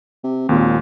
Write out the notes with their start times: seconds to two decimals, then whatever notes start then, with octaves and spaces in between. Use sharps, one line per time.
0.24 C3
0.49 G#1 D#2 A#2